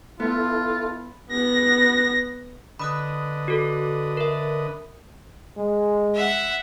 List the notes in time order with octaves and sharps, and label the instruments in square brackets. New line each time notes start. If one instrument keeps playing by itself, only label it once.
[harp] B3 [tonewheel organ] E4 A4 [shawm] F4
[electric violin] B3 A#6
[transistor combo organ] D3 B4 D#5 [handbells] B5 D#6 F#6
[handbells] F#4 A4
A#4 E5
[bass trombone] G#3
[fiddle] E5 F#5